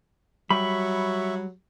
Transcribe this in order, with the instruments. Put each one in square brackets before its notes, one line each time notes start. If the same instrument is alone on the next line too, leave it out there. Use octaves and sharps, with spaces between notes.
[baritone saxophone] F#3 [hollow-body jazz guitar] G3 [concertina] E5 C#6 [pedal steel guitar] B5